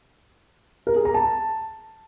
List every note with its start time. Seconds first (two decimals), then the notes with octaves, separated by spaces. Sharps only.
0.87 A#4
0.96 G#4
1.05 A#5
1.14 A5